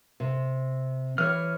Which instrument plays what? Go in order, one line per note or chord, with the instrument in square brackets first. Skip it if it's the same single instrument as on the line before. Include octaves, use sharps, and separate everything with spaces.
[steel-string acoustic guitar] C3
[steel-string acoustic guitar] E3 C#5 [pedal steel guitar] F6